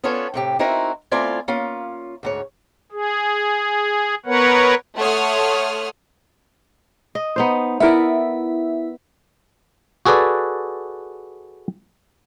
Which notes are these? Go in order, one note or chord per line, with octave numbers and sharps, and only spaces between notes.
B3 C#4 D4 F4 A4 C#5
A2 C3 G4
C4 D#4 E4 F#4 A#4 E5
A3 C4 E4 F4 D5 G#5
A#3 C#4 F4
D2 G#2 C#5
G#4
B3 A#4 B4 C#5 F#5
A3 C#5 F#5 C6 D#6 F6
D#5
B3 D#4 C5
B3 E4 A#4 D5 E5
F#4 G#4 A4 B4 D5